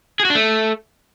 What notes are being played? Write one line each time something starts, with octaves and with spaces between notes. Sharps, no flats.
G#4
F#4
D4
A3